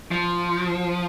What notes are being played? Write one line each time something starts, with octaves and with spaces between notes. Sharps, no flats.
F3